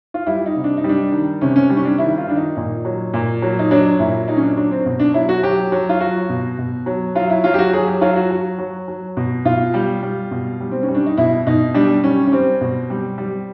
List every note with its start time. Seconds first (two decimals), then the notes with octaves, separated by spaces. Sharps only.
0.14 F4
0.27 G3 E4
0.46 D#4
0.56 C3
0.64 D4
0.77 D#4
0.84 G3
0.89 D4
1.12 D#3
1.41 C3 C#4
1.56 C#4
1.70 G3
1.77 C#4
1.85 D4
1.98 D#3 E4
2.18 F4
2.27 D#3 D4
2.37 D#4
2.57 A#2
2.85 F#3
3.14 A#2
3.42 F#3
3.59 D#4
3.71 F#3 D4
3.99 A#2 E4
4.28 F#3 D#4
4.36 C#4
4.43 D4
4.56 F#3 D4
4.71 C4
4.86 B2
5.00 D4
5.14 F#3 E4
5.29 F#4
5.43 F#3 G4
5.72 F#3
5.89 F4
6.00 F#3 F#4
6.29 B2
6.58 B2
6.86 F#3
7.15 F#3 F4
7.30 E4
7.44 F#3 F4
7.54 G4
7.59 F#4
7.73 F#3 G#4
7.87 G4
8.01 F#3 F4
8.16 F#4
8.31 F#3
8.58 F#3
8.88 F#3
9.17 B2
9.45 B2 F4
9.74 G3
10.03 G3
10.31 B2
10.60 G3
10.71 C4
10.83 C#4
10.88 G3
10.95 D4
11.06 D#4
11.17 B2 E4
11.47 B2 D#4
11.74 G3 D4
12.04 G3 C#4
12.27 C#4
12.32 G3 C4
12.61 B2
12.90 G3
13.18 G3